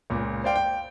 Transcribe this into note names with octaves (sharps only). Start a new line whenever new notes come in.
C#2 A#2
C5 D5 F5 G5
G5